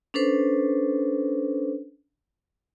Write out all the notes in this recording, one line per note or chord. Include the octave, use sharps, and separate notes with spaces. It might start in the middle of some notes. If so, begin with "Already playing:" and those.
C#4 D4 A4 B4 C5